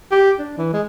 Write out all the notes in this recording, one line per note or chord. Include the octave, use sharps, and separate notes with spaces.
G4
D4
E3
G#3